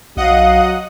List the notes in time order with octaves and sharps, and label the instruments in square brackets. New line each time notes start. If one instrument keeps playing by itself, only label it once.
[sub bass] B1 [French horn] F#3 [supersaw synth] D#5 F#5 D#6 [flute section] F5